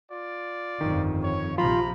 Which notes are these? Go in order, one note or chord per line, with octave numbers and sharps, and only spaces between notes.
F4 D5
G1 F2 D#3
C#5
A#1 C3 F3 F4 A#5 B5